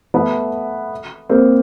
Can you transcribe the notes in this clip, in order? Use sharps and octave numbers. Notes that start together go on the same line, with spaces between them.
A3 B3
A#3 C4